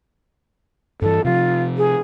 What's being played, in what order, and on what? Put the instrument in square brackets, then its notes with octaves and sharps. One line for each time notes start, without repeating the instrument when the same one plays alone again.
[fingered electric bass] G2 E3 [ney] A4
[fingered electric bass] C3 F3 [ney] F4
[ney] G#4